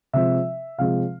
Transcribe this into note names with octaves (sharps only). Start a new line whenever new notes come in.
C3 F3 G#3 C4 E5
C3 F3 G#3 C4 F5